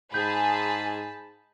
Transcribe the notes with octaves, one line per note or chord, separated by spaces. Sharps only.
G#2 G#4 A5 B5 G6